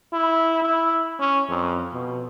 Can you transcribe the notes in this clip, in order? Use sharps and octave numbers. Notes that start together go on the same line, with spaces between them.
E4
E4
C#4
F2
B2